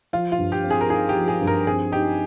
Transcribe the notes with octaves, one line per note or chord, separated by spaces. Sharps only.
F3 F4
F4
G2
G4
C4
G#4
A#4
D#4 G#4
G4
F3
G#4
G2
A#4
C4 G#4
D#4 G4